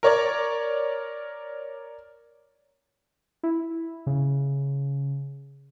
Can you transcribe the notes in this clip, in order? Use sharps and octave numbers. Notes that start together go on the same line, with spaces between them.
A#4 C#5 D5
E4
C#3